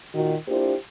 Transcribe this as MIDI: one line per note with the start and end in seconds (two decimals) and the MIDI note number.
0.14 0.35 46
0.14 0.35 51
0.14 0.35 66
0.48 0.74 58
0.48 0.74 62
0.48 0.74 64
0.48 0.74 65
0.48 0.74 67
0.48 0.74 72